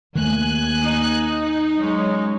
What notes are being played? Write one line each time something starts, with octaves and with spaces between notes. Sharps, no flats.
D#2 D#3 A3 G#5 F#6
D#4
F#3 G#3 C#4